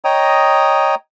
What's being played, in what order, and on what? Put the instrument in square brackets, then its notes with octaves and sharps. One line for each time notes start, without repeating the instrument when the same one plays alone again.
[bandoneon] C#5 D#5 G5 A#5 D#6